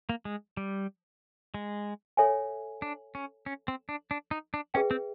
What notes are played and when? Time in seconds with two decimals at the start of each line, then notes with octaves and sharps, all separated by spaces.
0.09 A#3
0.25 G#3
0.57 G3
1.54 G#3
2.17 A4 C#5 E5 G#5
2.82 D4
3.15 C#4
3.46 C#4
3.68 C4
3.89 D4
4.11 D4
4.31 D#4
4.54 D4
4.74 C#4 G#4 B4 E5 G5
4.91 C4